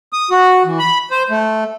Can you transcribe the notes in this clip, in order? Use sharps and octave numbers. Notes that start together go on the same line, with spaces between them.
D#6
F#4
E3
B5
C5
A3